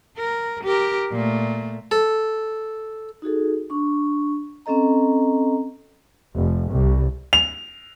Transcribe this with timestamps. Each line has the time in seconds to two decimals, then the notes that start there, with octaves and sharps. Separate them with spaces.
0.17 A#4
0.64 G4 A#4
1.12 A#2 A3
1.91 A4
3.22 D#4 F#4 G#4 A4
3.70 D4 C#6
4.66 C4 C#4 A4 D#5 A#5
6.34 F1
6.73 C2
7.33 F7